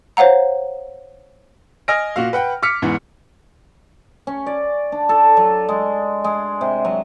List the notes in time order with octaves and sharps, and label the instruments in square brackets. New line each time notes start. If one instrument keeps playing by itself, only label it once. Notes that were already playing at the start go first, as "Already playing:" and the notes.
[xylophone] C5 C#5 F5 F#5 A#5
[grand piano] D#5 G#5 F6 A#6 D7
A#2 F#4 F5
B4 F#5 G5
D6 F6 B6 C#7
E2 G#2 E3
[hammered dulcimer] C#4
D5
D4
A4
F#3
G#3
G#3
C3
F#3